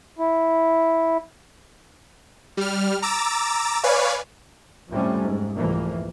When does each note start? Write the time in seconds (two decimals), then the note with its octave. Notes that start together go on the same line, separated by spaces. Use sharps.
0.19 E4
2.57 G3 F6
3.02 A#5 D6 E6 A6
3.83 B4 C#5 D5 F5 G#5
4.90 F2 A2 C3 G3 A3 C#4
5.21 G#2
5.55 C2 F2 G#2 E3 A3 A#3